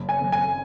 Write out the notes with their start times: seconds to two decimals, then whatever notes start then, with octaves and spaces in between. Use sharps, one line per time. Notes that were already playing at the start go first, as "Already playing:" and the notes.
Already playing: F#1
0.09 G#5
0.21 F#1
0.32 G#5